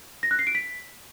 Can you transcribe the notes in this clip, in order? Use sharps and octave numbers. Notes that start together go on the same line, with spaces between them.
A#6
F#6
C7
D7
B6